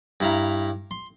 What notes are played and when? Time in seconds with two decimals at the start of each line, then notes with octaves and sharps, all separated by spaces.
0.20 G2 E4 F5 A#5
0.91 C6